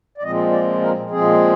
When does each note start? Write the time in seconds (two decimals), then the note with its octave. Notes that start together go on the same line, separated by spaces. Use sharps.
0.18 D5
0.23 A#2 F3 G#3 C4 D#5
0.52 D5
0.81 A#4
1.10 A#2 F3 G#3 C4 G#4